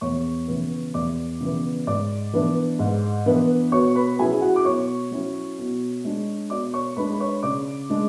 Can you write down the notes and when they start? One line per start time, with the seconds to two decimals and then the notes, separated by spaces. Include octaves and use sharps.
0.01 E2 C#5 C#6
0.47 C#3 E3 B3
0.94 E2 D5 D6
1.41 C#3 E3 B3
1.87 G#2 D5 D6
2.33 E3 B3 D4
2.79 G#2
3.26 E3 B3 D4
3.72 B2 C#5 C#6
3.95 B4 B5
4.19 F#3 C#4 E4 G#4 G#5
4.42 F#4 F#5
4.56 D6
4.65 B2 C#5 C#6
5.11 F#3 C#4 E4
5.58 B2
6.04 G#3 D4
6.50 B2 D5 D6
6.73 C#5 C#6
6.96 G#3 D4 B4 B5
7.12 B5
7.20 C#5 C#6
7.43 C#3 D5 D6
7.90 G#3 D4